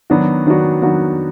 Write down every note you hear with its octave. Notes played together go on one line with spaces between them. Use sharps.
D#3 F#3 B3 D4 F#4
D#3 F#3 B3 D4 F#4
D#3 F#3 B3 D4 F#4